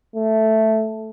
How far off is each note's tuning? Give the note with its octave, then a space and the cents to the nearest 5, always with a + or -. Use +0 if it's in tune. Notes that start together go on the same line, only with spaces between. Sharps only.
A3 +0